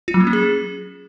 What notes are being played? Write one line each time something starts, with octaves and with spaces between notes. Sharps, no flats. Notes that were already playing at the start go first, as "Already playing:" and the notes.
F4
F#3
A#3
C#4
G#4